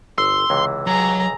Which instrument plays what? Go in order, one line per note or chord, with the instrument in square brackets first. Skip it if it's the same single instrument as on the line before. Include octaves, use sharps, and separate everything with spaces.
[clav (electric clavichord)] G1 [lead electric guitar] C6 [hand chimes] E6
[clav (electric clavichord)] C#2 C3 E3
[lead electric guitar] F#3 [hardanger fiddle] G#4 A#5